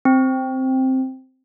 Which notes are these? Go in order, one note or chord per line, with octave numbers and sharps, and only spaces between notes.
C4